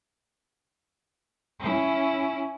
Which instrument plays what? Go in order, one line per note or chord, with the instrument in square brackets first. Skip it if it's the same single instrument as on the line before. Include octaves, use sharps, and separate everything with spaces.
[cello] C#4 E4